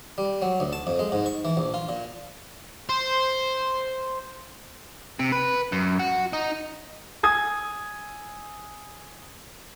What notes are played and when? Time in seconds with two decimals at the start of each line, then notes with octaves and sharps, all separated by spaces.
0.18 G3
0.42 F#3
0.60 D2
0.73 A5
0.87 F2
0.99 G#3
1.12 G#2
1.26 C#6
1.45 E3
1.57 A#1
1.74 F4
1.89 A#2
2.89 C5
5.19 C3
5.32 B4
5.72 F#2
5.99 F#4
6.33 D#4
7.23 G#5 D#6 G#6